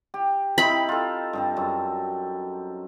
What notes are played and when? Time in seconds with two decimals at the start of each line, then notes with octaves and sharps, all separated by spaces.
0.14 G4
0.58 C4 D#4 E4 B5
0.89 F4 A4
1.33 G2 C4 A5
1.57 F#2